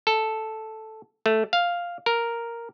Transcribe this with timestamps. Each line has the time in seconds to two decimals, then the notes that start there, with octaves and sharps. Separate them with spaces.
0.07 A4
1.26 A3
1.53 F5
2.06 A#4